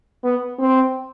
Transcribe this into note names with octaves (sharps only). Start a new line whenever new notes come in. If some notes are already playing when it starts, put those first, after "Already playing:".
B3
C4